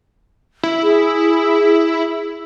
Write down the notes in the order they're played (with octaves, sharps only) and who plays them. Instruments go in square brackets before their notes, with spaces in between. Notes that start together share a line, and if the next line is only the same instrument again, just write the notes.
[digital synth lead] E4
[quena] G#4